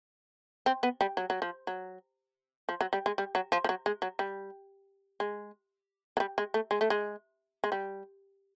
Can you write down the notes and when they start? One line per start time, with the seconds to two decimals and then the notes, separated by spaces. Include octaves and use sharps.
0.66 C4
0.83 B3
1.01 G3
1.17 F#3
1.30 F#3
1.42 F3
1.67 F#3
2.69 F3
2.81 F#3
2.93 G3
3.06 G#3
3.18 G3
3.35 F#3
3.52 F3
3.64 F3
3.69 F#3
3.86 G#3
4.02 F#3
4.19 G3
5.20 G#3
6.17 F#3
6.20 G3
6.38 G#3
6.54 A3
6.71 G#3
6.81 A3
6.90 G#3
7.64 G#3
7.72 G3